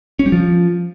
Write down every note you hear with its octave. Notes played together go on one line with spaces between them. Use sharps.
C#4
G3
F3